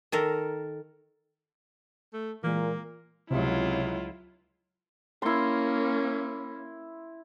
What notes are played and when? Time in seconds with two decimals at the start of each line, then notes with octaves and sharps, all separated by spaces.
0.12 D#3 A4 A#4
2.13 A3
2.44 A#2 E3 G#3 A#3
3.30 C#2 C3 F#3 E4 F4
5.22 A#3 C#4 E4 C6